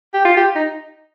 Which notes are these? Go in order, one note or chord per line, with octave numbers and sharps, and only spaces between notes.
G4
F4
G4
D#4